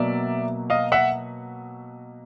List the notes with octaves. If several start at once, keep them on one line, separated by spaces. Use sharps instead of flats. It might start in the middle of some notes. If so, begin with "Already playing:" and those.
Already playing: B2 F#3 A#3 D5 E5
D#5 F5
E5 F#5